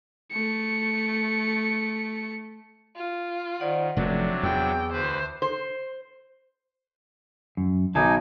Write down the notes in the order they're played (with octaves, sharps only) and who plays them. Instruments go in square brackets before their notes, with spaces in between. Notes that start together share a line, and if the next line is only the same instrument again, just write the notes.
[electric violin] A3 C#7
[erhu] F4
[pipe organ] D#3 [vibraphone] C5 D5 F#5
[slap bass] F1 F2 [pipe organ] C3 F#3 D4 [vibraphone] D5
[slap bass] E2 [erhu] G5 [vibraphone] E6
[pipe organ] D2 B4 [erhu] C5
[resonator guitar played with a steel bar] C5
[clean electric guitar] F#2
[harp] B1 [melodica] D#4 G#5 [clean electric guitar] A5